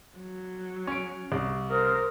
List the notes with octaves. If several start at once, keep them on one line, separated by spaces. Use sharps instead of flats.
F#3
C#4 D7
C2
A#4 C5 D#6 F6